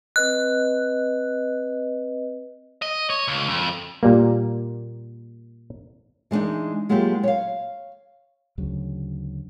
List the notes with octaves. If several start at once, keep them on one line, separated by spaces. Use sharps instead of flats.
C4 B4 D#5 F#6
D#5
C#5
C#2
F2
A#2 G3 A#3
E3 G#3 A#3 D4 D#4
F#3 G#3 A#3 E4 F4 G4
C#5 F5
D2 C#3 F#3